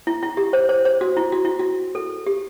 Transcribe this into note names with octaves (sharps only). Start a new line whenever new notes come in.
E4
E4
G4
C5
C5
C5
F#4
E4
F#4
E4
F#4
A4
G4